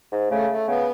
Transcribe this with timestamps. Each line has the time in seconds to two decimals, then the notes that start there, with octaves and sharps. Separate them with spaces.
0.12 G#2
0.31 C#3 A3
0.50 A3
0.68 C#3 B3